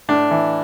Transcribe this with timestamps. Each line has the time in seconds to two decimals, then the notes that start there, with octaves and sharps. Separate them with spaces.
0.09 A2 D4
0.31 E3